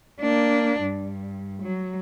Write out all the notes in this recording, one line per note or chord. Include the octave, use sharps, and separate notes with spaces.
A#3 D4
G2
F#3